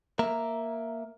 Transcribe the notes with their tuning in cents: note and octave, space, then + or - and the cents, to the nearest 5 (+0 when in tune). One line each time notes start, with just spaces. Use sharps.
A#3 +0 E5 +0 A#5 -5